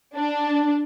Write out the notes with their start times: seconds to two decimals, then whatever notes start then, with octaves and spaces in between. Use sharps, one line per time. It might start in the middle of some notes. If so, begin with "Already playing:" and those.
0.15 D4